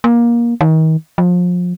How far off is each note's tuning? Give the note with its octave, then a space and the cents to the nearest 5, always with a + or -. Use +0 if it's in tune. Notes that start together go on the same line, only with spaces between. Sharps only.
A#3 +20
D#3 +35
F3 +30